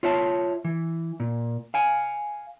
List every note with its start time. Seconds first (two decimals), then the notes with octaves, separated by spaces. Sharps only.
0.03 F4 C#5 E5 A5
0.65 E3
1.20 A#2
1.74 F5 G#5